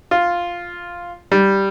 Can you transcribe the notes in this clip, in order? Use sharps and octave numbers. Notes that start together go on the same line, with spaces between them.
F4
G3